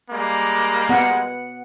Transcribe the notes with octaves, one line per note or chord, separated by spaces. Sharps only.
G3 G#3 A#3
B3 F#5